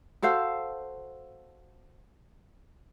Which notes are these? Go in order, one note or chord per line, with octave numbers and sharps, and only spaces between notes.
F#4 A4 C5 F5